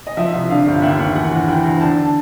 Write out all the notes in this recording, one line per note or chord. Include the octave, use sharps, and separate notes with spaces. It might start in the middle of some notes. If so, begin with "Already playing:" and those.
D#5
F3 E5
C2
D3 F5
G1
D#2 E5
D#2
E3 F#5
G1
E3 G5
D2
D3 A5